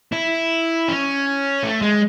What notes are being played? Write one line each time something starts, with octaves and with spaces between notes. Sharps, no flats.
E4
C#4
A3
G#3